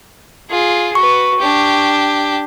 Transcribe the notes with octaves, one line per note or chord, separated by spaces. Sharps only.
F4 G#4
F#4 B4 C#6
D4 G4